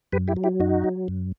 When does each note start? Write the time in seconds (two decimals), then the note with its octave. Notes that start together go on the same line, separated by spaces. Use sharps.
0.12 F#2 G4 B4
0.28 E4 G4
0.36 F#3
0.44 E4 G4
0.60 F#2 D#4 F#4
0.84 F#3
1.08 F#2